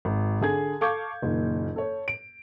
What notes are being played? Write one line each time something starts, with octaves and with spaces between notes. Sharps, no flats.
G#1
D3 G#4 G#6
A4 F5 C#6 D6 G6 G#6
F#1 A#2 D#3
A4 C#5
D7